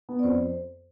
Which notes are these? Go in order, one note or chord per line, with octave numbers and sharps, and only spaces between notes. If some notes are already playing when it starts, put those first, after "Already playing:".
B3
D5
F2 C5